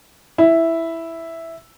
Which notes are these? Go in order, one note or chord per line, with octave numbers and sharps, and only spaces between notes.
E4